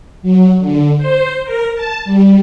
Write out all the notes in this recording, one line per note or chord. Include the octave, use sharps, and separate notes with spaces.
F#3
D3
C5
A#4
A5
G3